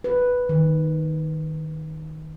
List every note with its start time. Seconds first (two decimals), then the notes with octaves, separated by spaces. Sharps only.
0.04 B4
0.49 D#3